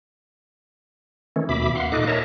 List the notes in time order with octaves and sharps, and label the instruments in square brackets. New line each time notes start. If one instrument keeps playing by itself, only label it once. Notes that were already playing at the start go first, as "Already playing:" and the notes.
[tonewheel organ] D#3 E3 A3 C#4
D#2 B2 E5 B5 D6
F5 F#5 C6
A#2 D#4 A4 D#5 D6 F#6
A#4 C#5 D#5 E5 A5 A#5